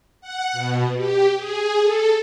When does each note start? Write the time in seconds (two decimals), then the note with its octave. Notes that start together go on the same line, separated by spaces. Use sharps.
0.21 F#5
0.53 B2
0.96 G4
1.35 G#4
1.81 A4